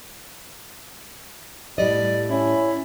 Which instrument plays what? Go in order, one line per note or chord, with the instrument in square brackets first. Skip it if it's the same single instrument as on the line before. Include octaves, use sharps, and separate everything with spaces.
[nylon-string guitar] A2 G3 D#5 [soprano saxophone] D5
[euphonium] C#4 [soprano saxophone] E4